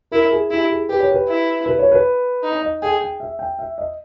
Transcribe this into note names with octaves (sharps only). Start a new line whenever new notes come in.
E4 A#4
G#4
E4 G4
G#4
G4 B4
C#5
B4
E4
B4
C#5
B4
D#4
D#5
G#4 G5
G5
E5
G5
E5
D#5